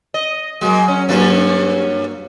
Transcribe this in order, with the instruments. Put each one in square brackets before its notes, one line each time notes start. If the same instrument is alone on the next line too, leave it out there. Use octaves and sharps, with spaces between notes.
[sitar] D#5
[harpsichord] F#3 [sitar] G#3 A#3
[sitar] C#4
[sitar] G2 C#4 [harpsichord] F#3 A#3